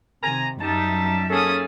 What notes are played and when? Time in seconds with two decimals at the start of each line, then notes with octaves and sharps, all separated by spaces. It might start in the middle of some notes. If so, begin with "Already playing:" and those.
0.23 C3 D#3 G#5 A#5
0.61 F#2 G3 D#4 E5 A5
1.30 A#3 C#4 G#4 A4 D#6